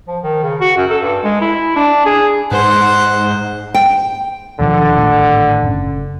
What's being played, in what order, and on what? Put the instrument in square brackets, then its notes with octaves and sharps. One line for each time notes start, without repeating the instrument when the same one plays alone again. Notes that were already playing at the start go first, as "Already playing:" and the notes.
[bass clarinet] F3
D#3
C#3
F#4
F#2
A4
G2
G#3
E4
D4
G#4
[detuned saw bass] G#2 [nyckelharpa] C5 F#5
[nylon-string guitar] G5
[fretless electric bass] D#2 B2 F3 [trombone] D3
[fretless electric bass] G#1 A2
F#1 C#4